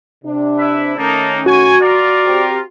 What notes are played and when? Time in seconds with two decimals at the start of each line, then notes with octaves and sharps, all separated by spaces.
0.25 C3 D4
0.58 E4 B4 E5
0.98 D#3 A3 A#3 C#4 D#4 A5
1.46 F#4 G#5 C#6
1.81 F4 A#4 D5
2.25 C4 G4